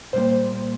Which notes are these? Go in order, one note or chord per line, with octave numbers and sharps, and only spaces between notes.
A#2 G3 A#3 C5